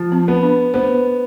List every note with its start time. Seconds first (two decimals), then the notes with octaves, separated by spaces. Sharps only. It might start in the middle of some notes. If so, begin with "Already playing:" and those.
Already playing: F3
0.12 C4
0.28 B3
0.43 D4
0.74 B3 C5